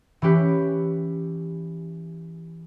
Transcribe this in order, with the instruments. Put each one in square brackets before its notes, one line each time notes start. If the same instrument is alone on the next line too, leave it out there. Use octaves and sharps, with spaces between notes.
[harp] E3 C#4 G4 B4